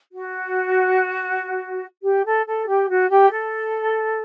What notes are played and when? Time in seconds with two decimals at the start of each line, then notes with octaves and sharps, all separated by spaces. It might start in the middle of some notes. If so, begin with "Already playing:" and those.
0.12 F#4
2.03 G4
2.25 A4
2.47 A4
2.67 G4
2.89 F#4
3.10 G4
3.31 A4